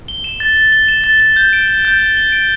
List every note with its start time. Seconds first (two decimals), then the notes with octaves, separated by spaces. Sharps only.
0.08 G7
0.24 E7
0.40 A6
0.56 A6
0.72 G7
0.88 E7
1.04 A6
1.20 G7
1.36 G6
1.53 D7
1.68 G7
1.85 G6
2.00 G7
2.17 G7
2.32 D7